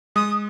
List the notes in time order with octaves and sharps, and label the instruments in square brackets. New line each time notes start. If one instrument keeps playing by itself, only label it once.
[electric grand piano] G#3 [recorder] D#6